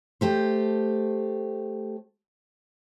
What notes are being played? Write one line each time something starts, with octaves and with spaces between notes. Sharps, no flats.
A3 G4 C5